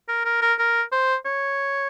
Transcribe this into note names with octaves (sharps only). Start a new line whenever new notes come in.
A#4
A#4
A#4
A#4
C5
C#5